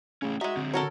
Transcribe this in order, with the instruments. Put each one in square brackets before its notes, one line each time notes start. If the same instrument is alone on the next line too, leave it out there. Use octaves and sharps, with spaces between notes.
[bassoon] C#3 [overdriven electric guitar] A3 C#4
[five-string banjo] G#3 D#4 [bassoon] F#4 [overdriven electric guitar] E5
[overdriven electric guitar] D3 C4
[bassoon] F#4 [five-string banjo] A4 A#4 C#5